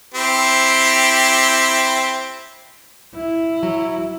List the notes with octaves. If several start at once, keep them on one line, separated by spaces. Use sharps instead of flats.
C4 E4 G4
E4
F#3